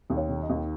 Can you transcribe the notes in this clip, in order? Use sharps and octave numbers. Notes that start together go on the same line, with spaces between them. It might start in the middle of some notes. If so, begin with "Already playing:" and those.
D#2
C#5
D#3
D#5
D#2